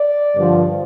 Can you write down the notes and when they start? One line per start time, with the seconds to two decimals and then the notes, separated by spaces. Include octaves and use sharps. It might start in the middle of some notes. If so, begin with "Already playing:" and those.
Already playing: D5
0.35 G2 D3 F3